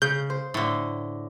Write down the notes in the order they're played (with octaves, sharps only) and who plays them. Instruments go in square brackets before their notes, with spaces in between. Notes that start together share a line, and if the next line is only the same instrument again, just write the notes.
[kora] C#3 [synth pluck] G6
[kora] C5
[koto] A2 D3